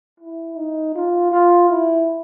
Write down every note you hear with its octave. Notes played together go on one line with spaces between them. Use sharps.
E4
D#4
F4
F4
E4